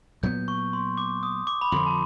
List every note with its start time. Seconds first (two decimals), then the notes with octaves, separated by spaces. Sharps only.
0.23 A#2 F#3 B3 G6
0.48 C#6
0.73 C6
0.97 D6
1.23 D#6
1.47 D6
1.61 B5
1.72 F2 D3 F3 C6
1.86 A5